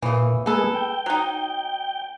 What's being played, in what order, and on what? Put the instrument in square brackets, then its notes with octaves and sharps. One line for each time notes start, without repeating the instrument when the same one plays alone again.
[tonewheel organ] A#2 [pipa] C#3 E3
[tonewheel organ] G#3 A#3 G#4 [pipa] B3 A4
[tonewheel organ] G5
[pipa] F#3 D#4